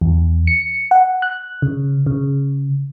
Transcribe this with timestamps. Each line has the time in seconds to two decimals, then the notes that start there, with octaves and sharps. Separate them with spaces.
0.01 E2
0.47 C#7
0.91 F#5
1.22 F#6
1.62 C#3
2.06 C#3